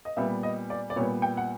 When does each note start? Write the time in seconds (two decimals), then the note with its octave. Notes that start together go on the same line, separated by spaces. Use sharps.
0.05 D#5
0.17 A#2 G3 B3 E5
0.43 D#5
0.70 D5
0.90 D5
0.96 A#2 G3 B3 C#5
1.22 G5
1.37 F#5